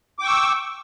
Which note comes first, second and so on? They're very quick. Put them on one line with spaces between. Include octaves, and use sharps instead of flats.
D6 G5 C#6 E6